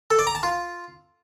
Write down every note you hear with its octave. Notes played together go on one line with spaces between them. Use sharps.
A4
D5
A#5
A5
F4